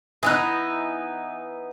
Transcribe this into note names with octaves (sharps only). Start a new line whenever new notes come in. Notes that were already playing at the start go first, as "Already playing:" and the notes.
E3 B3 D#4 D#6 E6 F#6